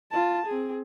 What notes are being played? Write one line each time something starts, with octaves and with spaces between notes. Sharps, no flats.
F4 A5
C4 G#4